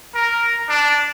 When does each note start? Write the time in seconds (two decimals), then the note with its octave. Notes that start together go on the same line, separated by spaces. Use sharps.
0.15 A#4
0.69 D4